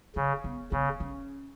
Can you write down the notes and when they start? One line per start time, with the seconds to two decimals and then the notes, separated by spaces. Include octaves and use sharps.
0.16 C#3 C#4
0.44 B3
0.72 C#3 B3
1.00 C#4